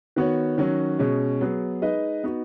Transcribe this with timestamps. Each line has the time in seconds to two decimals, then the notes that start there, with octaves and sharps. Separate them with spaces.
0.16 D#3 B3 F#4 C#5
0.58 D#3 F#3 C#4 F#4
0.99 B2 G#3 C#4
1.41 F#3 B3 G#4
1.82 G#3 D#4 B4 D#5
2.24 B3 D#4 F#4